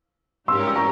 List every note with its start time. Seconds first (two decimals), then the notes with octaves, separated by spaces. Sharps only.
0.48 G#2 G3 C#4 G4 A#4 C6 E6
0.67 E6
0.76 A#5 C#6